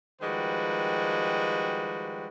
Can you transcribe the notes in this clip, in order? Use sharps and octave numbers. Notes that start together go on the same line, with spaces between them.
D#3 F3 G3 G#3 F#4 B4